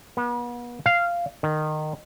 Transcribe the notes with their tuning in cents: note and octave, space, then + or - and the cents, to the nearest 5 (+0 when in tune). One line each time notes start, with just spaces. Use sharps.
B3 -40
F5 -10
D#3 -20